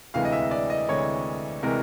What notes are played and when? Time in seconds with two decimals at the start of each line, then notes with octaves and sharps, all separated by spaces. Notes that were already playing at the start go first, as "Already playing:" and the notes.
0.14 D2 C3 E3 G#3 F5
0.25 D#5
0.32 E5
0.51 D5
0.70 D#5
0.88 D2 C3 E3 G#3 C#5
1.63 C3 E3 G#3 A#4